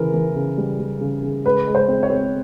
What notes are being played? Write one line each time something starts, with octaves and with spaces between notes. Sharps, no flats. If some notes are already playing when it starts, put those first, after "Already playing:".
Already playing: C#3 E3 A#4
E3
C#3
G3
G3
C#3
C#3
G#3 B4
G#3
C5
C4
C#5
C4